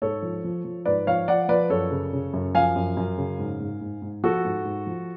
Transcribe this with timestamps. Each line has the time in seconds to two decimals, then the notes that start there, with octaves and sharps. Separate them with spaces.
0.02 G#2 A4 C#5
0.22 F3
0.44 F3
0.65 F3
0.85 G#2 B4 D5
1.07 F3 C#5 F5
1.28 F3 D5 F#5
1.49 F3 B4 D5
1.70 F#2 A4 C#5
1.91 C#3
2.13 C#3
2.33 F#2
2.55 F3 F5 G#5
2.76 F#2
2.97 F#2
3.18 C#3
3.39 G#2
3.60 G#2
3.81 G#2
4.02 G#2
4.23 F3 F#4 A4
4.45 G#2
4.65 G#2
4.87 F3